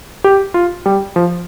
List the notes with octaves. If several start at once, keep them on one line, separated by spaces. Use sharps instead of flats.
G4
F4
G3
F3